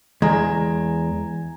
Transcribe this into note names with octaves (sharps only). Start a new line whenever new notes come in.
E2 G#3 G#5 A#5 G#6